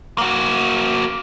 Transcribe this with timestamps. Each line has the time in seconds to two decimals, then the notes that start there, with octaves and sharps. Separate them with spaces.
0.18 A#3 F#4